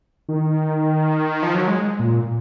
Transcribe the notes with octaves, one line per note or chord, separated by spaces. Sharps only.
D#3
F3
F#3
G#3
A#2